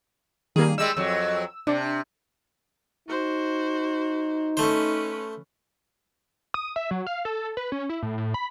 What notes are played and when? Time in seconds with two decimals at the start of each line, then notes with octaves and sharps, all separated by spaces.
0.56 D#3 G3 A#3 G#4
0.78 G3 G#3 E6
0.97 F2 F#3
1.67 C3 D4
3.09 D#4 F#4 C5
4.57 A3 C#4 B4 C5
6.54 D#6
6.76 E5
6.91 F#3
7.07 F5
7.25 A4
7.57 B4
7.72 C#4
7.89 E4
8.02 A2
8.18 A2
8.34 B5